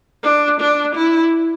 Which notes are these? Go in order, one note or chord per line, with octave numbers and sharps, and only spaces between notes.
D4
D4
E4